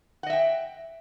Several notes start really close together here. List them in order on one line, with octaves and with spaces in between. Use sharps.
F#5 D#5 E5 G5